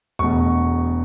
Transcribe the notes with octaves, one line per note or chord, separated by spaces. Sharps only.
E1 E2 B2 A3 C#6